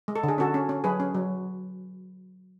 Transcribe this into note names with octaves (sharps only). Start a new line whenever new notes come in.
G#3
A4
D3 G#4
C#4 F#4 A4
C#4
C#4
F#3 G#4 B4
C#4
F#3